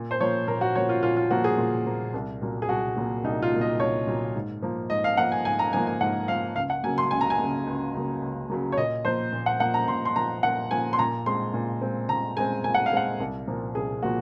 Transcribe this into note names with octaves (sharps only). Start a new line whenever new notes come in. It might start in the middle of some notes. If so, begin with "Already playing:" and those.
Already playing: A#2
C5
F3 A#3 C#5
A#2 A#4
F#4
F3 A#3 C#5
F4
A#2 F4
F4
F3 A#3 F#4
G#4
A#2
F3 A#3
C2
A#2 F#3 A#3
G#4
C2 F#4
A#2 F#3 A#3
C2 D#4
F4
A#2 F#3 A#3
D#5
C2 C#5
A#2 F#3 A#3
G#2
F3 A#3
G#2 D#5
F5
F3 A#3 F#5
G#5
G#2 G#5
A#5
F3 A#3 G#5
G#5
G#2 F#5
F3 A#3 F5
C#2 F5
F#5
C#3 F#3 A#3 G#5
C6
C#2 G#5
A#5
G#5
C#3 F#3 A#3
C#2
C#3 F#3 A#3
C#2
C#3 F#3 A#3
C#5
A#2 D#5
F3 A#3 C5
A#2
F#5
F3 A#3 F#5
A#5
A#2 C6
C6
F3 A#3 A#5
A#2 F#5
F3 A#3 G#5
C6
A#2 A#5
G#3 C4 C6
A#2
G#3 C4
A#2 A#5
G#3 C4 G#5
A#2 G#5
F#5
F5
G#3 C4 F#5
C2
A#2 F3 A#3
C2 G#4
A#2 F3 A#3 F#4